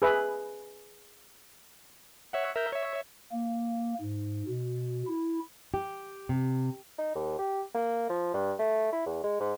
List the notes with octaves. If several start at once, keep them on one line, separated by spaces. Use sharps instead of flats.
G#4 B4 E5
C#5 E5 F#5
A#4 E5 G6
C#5 E5
A#3
G#2
B2
E4
G4
C3
D#4
D#2
G4
A#3
F3
G2
A3
E4
E2
G#3
G#2